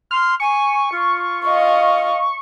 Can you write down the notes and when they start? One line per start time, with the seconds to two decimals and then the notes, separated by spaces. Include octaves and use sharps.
0.11 C6 F6
0.40 G#5 C#6
0.92 F4
1.45 D#5 F5